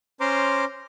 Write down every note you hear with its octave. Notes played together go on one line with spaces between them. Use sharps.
C#4 C5 A#5 C6 D6 F6